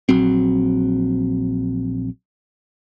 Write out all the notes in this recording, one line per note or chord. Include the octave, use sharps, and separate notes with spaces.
A#1 F#3 C4